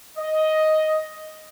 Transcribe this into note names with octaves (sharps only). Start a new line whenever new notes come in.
D#5